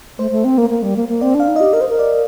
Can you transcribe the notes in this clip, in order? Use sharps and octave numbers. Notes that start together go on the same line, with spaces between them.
A3 C5
A3
C4
A#3
A#3
G3
A#3
A#3
C4 D5
D4
F5
D#4
G4 D#5
A#4 D#5
C5
A#4
D5